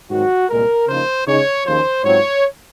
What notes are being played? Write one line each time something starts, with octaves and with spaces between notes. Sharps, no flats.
G#2 D#3 F#3 C4 F#4
C2 A#2 G#3 A#4
C#3 F3 A#3 D#4 C5
C#3 G#3 D#4 C#5
D#2 C#3 F3 C5
G#2 F#3 C4 F4 C#5